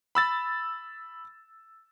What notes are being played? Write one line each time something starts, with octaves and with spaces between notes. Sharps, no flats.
B5 E6 A6